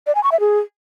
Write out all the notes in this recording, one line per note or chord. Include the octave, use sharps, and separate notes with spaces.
D5
G#5
C#6
E5
G#4